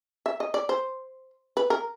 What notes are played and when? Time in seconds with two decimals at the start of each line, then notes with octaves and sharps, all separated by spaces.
0.26 E5
0.40 D#5
0.54 D5
0.69 C5
1.57 B4
1.70 A#4